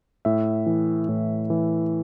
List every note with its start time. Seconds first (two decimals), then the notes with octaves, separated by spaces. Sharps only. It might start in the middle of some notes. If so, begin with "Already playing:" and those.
0.25 A2 E5
0.66 E3
1.09 A2
1.50 E3